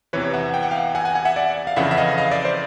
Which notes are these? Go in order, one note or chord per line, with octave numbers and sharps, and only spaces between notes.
E2 C3 E3 B4 C#5
E5 F#5
G5
F#5
F5 G5
F#5 G#5
F#5 G#5
F#5 G#5
E5 F#5
D5 E5
F5
F2 C#3 E3 E5 F#5
E5
D#5 F5
D#5 F5
D5 E5
C5 D5